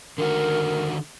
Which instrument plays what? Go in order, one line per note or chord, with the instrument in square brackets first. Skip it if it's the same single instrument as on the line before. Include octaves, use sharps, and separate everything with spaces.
[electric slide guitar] D3 D#3 F#4 [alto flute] A#4